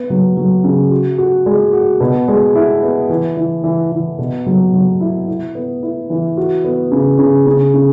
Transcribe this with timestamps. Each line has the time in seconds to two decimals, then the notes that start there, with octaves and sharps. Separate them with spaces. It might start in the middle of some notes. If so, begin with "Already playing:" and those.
Already playing: B3
0.10 F#3
0.37 F#3
0.64 C#3
0.91 F#4
1.18 F#4
1.46 G#3
1.73 F#4
2.00 B2
2.28 G#3
2.55 E4
2.83 B3
3.09 E3
3.37 E3
3.64 E3
3.92 E3
4.18 B2
4.46 F#3
4.73 F#3
5.00 E4
5.28 E4
5.55 B3
5.83 E4
6.10 E3
6.37 F#4
6.64 B3
6.92 C#3
7.19 C#3
7.46 C#3
7.74 C#3